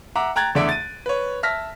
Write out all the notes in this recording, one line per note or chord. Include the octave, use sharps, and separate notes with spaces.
E5 F#5 A#5 D6
G5 A#5 F#6 G#6 A6
E2 D3 A3 D5 E5 D7
A6 D#7
B4 C#5
E5 A5 F6 A#6 B6